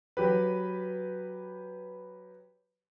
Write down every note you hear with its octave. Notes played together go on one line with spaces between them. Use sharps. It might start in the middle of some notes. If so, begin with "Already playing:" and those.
F#3 G4 B4